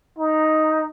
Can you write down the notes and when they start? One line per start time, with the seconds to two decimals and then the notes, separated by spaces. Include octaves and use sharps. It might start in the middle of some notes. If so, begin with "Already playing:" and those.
0.18 D#4